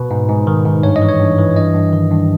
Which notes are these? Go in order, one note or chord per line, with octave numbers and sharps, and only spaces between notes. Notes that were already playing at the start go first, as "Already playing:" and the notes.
Already playing: B2 B4
G#2
G#2
D#3
G#2
G2 C#5
D#5
E3
C#5
G2
E3
G2 D#5
G2
D#3
G2